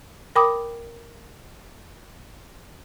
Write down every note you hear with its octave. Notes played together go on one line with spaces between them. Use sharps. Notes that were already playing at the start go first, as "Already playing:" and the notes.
A#4 G5 B5 D6 D#6